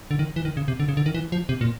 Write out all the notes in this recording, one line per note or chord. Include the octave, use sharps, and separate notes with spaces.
D3
D#3
E3
D#3
C#3
C3
D3
C#3
D3
D#3
E3
F3
C3
A#2